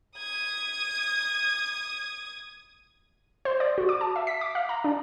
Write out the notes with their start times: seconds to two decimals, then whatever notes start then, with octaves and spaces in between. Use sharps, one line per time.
0.18 D#6 G#6
3.45 C5
3.60 D5
3.78 F#4
3.89 D6
4.01 A5
4.16 E5
4.27 B6
4.41 D6
4.55 F5
4.69 A#5
4.84 D4